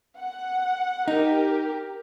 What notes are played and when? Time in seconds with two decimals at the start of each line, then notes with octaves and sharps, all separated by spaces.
0.18 F#5
1.08 D#4 G4 A#4